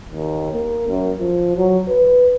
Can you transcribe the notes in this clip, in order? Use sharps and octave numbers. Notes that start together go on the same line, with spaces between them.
D#2
A#3
F#2
F3
F#3
B4